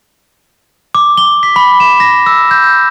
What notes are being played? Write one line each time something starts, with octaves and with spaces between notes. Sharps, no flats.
D6
G7
B6
B5
E7
A#6
E6
G6